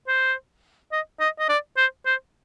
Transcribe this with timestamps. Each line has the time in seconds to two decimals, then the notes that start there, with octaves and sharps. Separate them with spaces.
0.08 C5
0.92 D#5
1.20 D#5
1.39 D#5
1.49 D5
1.77 C5
2.06 C5